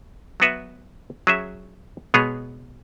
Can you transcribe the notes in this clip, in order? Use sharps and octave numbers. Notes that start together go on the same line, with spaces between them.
F#3 B3 F#4 B4 E5
F#3 C#4 G#4 E5
B2 G#3 B3 G#4 C#5